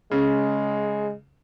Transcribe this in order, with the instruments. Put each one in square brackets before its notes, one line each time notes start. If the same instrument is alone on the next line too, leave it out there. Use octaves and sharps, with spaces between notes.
[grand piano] C#3 [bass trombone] G#3